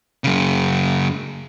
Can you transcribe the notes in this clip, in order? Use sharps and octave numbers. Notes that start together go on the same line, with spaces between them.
F#2 C#3